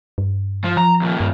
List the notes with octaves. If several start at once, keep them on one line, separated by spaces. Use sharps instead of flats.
G2
F3 F4
F3 A#5
D#2 A#2
G2